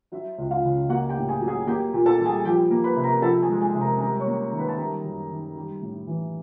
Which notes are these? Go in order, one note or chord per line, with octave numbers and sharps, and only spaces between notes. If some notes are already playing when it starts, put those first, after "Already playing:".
F#3 E4 E5
C#2
F4 F5
C#3
A#3 F#4 F#5
G4 G5
A2
G#4 G#5
F#3
G#4 G#5
A#3 G4 G5
A#2
A4 A5
G3
G#4 G#5
F3 G4 G5
A#3
B4 B5
C3
A#4 A#5
F3 A4 A5
G#4 G#5
G#3
G#4 G#5
C3
A#4 A#5
G3 A#4 A#5
C#5 C#6
A#3
D#3
B4 B5
A5
G3 A#4 A#5
F#2
D#3
G3
A2
E3